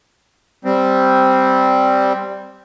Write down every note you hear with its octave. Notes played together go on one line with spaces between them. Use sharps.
G3 C4